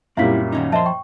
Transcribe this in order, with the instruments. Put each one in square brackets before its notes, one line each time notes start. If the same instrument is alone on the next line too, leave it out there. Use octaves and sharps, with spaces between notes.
[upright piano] F#2 A#2 G3 [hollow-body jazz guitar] C4 E4 [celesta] E5 F5 B6
[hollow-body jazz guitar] D#3 C#4 D#4
[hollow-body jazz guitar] F3 C5 C6 [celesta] D#5 E5 A5
[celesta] G5 C#6